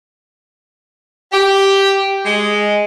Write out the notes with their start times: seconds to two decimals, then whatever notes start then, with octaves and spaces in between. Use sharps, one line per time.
1.32 G4
2.26 G#3